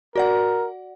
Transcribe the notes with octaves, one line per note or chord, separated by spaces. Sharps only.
F#4 A#4 D5 F#5